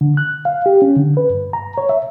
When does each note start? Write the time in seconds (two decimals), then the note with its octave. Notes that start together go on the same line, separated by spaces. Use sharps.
0.01 D3
0.17 F#6
0.45 F5
0.66 G4
0.82 C#4
0.96 D3
1.17 B4
1.30 G2
1.53 A#5
1.78 C#5
1.89 E5